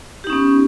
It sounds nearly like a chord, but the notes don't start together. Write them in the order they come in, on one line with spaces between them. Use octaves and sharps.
G4 D#4 C#4 B3